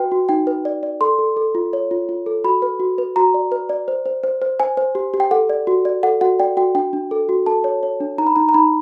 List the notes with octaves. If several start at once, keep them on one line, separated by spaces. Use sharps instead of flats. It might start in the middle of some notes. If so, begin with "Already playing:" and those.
Already playing: F#4 B4 G5
F#4
D#4 G5
B4
D5
D5
A4 C6
A4
A4
F4
C#5
F4
F4
A4
F#4 B5
B4
F#4
B4
F#4 A#5
D5
B4
D5
C5
C5
C5
C5
C5 G#5
C5
G4
G4
G5
A4 F#5
D5
F#4
D5
A4 F#5
F#4 F#5
D5 G5
F#4 G5
D4 G5
D4
A4
F#4
A4 A5
C#5
C#5
D4
D#4 A#5
B5
D#4 A#5
A#5
D#4 B5